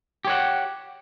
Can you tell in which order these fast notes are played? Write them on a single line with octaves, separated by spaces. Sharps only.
G4 C#5 F#5